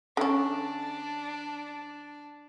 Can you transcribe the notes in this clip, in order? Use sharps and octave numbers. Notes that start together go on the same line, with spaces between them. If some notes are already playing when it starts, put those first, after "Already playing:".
D3 C#4 D4